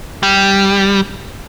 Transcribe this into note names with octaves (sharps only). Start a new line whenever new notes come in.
G3